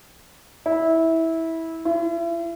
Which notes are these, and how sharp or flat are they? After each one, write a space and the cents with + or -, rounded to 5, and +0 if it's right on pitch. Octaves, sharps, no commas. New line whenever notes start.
E4 -15
E4 +40